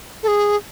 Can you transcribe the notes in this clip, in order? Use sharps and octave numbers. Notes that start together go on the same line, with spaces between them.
A4
G#4